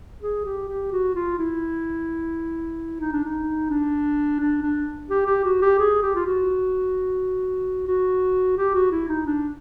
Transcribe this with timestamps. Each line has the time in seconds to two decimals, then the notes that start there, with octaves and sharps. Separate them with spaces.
0.22 G#4
0.45 G4
0.68 G4
0.92 F#4
1.15 F4
1.39 E4
3.01 D#4
3.13 D4
3.25 D#4
3.70 D4
4.40 D4
4.63 D4
5.10 G4
5.27 G4
5.44 F#4
5.62 G4
5.79 G#4
6.02 G4
6.15 F4
6.26 F#4
7.87 F#4
8.57 G4
8.75 F#4
8.92 E4
9.09 D#4
9.26 D4